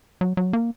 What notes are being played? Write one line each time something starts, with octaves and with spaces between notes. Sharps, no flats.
F#3
F#3
A#3